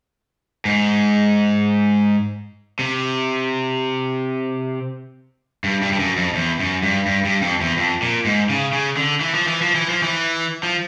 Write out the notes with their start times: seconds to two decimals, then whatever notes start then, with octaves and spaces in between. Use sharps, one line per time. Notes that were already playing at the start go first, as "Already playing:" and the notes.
0.65 G#2
2.79 C3
5.64 G2
5.82 G2
5.93 G2
5.99 F#2
6.17 F2
6.35 E2
6.60 F#2
6.83 G2
7.06 G2
7.25 G2
7.42 F2
7.61 E2
7.77 F2
8.02 A#2
8.25 G#2
8.50 C#3
8.73 C#3
8.97 D3
9.21 E3
9.34 F3
9.48 E3
9.62 F3
9.75 E3
9.89 F3
10.03 E3
10.63 F3